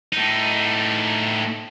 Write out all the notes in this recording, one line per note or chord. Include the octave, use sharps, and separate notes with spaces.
A2 D#4